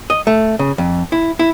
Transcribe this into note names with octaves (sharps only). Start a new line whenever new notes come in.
D#5
A3
C#3
F2
E4
E4